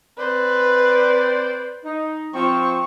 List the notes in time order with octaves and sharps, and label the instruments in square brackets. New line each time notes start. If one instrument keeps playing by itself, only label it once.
[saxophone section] C4 C5 D5 [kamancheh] B4
[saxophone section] D#4
[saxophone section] F3 C4 [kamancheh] C#6